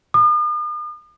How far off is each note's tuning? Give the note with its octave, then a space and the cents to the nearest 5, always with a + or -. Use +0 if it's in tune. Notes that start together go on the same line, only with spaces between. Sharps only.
D#6 -45